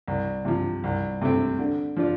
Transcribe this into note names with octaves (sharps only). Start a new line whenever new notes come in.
C2
C3 F3
C2
C3 A3 C4
D3
F3 D4 F4